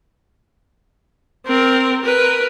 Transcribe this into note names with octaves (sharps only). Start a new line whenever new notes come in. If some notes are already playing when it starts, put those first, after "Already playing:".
C4 A#4
A#4 B4